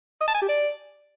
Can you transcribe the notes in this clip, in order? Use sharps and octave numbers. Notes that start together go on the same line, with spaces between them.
D#5
A5
G#5
G4
D5